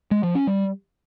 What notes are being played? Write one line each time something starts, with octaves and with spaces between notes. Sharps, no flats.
G#3
F3
C#4
G3